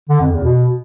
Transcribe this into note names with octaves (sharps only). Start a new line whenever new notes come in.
D3
F2
E2
B2